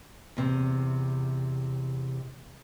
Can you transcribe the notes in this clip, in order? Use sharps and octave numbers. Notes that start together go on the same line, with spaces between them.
E2 C3